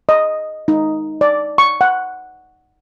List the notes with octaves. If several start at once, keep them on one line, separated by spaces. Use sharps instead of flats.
D#5
D#4
D5
C#6
F#5